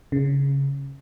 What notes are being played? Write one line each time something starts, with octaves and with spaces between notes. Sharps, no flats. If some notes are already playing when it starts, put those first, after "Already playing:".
C#3